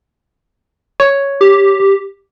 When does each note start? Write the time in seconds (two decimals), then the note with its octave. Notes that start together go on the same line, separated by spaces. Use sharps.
1.00 C#5
1.41 G4